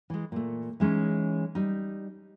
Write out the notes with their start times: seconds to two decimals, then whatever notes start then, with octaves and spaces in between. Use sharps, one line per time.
0.10 E3 G#3
0.32 A#2 A3
0.80 E3 G#3 C#4 D#4 E4
1.55 G3 D#4